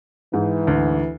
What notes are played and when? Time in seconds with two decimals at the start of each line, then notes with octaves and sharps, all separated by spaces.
0.33 G#2 E3
0.67 D2